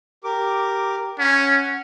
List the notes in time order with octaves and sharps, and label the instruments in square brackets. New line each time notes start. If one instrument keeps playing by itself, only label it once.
[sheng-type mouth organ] G4 A#4 D6
[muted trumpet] C#4 [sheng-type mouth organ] F#5